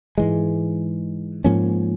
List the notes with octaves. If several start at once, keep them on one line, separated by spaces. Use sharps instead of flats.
G#2 E3 G#3
G#2 F3 A#3 C#4